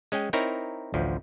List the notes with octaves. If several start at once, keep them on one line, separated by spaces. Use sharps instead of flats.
G#3 C#4 G#4 G5
C4 D#4 E4 A#4 C#5 A#5
A1 D2 F3